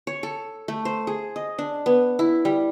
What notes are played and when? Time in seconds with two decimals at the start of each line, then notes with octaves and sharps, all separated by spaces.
0.07 C#5
0.23 A4
0.68 A3
0.85 C5
1.07 G#4
1.36 D#5
1.58 D4
1.86 B3
2.19 E4
2.45 G3